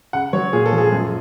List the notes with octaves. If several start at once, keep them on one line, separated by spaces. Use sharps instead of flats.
C#3 F#5
F#3 C#5
A#2 G#4
A4
F3
G#4
F#2